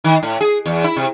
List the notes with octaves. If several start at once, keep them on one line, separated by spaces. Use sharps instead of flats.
D#3
A2
G#4
E2
E4
C3